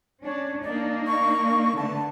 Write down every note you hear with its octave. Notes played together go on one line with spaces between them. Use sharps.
C#4 D4 C#5
A#3 D4 D#4 D5
C#6
D3 A3 B3 A5